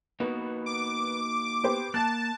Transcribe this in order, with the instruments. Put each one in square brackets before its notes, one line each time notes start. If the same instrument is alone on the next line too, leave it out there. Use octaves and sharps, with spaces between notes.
[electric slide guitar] A#3 D#4 F#4 [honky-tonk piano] B3
[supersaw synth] D6
[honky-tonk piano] B3 G4 C5
[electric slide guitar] A#3 [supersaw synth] A5 [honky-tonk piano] F#6 A6